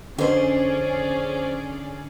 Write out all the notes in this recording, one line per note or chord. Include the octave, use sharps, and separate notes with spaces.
F2 D3 C#4 G#4 C5 D5